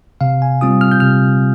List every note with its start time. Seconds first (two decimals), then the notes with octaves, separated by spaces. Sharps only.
0.21 C3 F5
0.42 G#5
0.61 G3 C4 F4 D#6
0.81 F6
0.92 G6
1.00 C3 F6